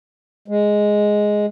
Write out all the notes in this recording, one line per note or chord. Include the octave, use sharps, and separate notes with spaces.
G#3